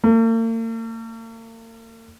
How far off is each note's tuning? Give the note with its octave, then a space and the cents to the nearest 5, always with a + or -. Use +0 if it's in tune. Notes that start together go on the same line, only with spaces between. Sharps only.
A#3 -45